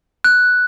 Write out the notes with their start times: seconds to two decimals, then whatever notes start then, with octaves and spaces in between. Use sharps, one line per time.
0.24 F#6